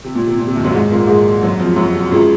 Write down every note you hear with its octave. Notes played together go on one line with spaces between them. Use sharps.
C3
A#2
C3
A#2
C3
D#2 D#3
F#2 F#3
G#2 G#3
A#2 A#3
G#2 G#3
F#2 F#3
F2 F3
F#2 F#3
C3
C#2 C#3